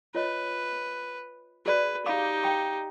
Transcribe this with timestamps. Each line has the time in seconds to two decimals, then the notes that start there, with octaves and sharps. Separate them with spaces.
0.15 F4 B4 C#5 D#5
1.66 F#4 G#4 B4 D5
2.06 D#4 G4 F5 B5 D6
2.43 G5 B5